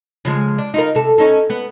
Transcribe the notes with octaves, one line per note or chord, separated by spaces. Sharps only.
C#3 F3 G#3
D4
D#4 F4 A#4
C3 A4
C#4 D#4 A4
B3